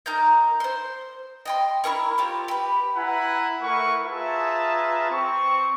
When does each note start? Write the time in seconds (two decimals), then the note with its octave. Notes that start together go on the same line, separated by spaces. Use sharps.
0.06 D#4 A#4 A#5 G6
0.60 C5 C6
1.46 D#5 G5 C6
1.84 E4 G#4 A#4 C#6
2.18 C4 F4 G4
2.48 G4 B4
2.96 E4 B4 F#5 G#5 A#5 B5
3.62 A3 E4 A#4 B4 F#5 C#6
4.06 F4 G#4 B4 E5 A5 A#5
5.10 C4 C#6